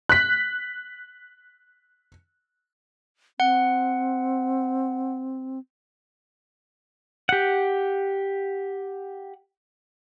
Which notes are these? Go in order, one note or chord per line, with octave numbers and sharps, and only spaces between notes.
F#6 B6
C4 F#5
G4 F#5